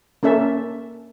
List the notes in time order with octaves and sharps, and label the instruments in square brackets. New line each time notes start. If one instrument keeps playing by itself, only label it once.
[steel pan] A#3 C#4 A4 E5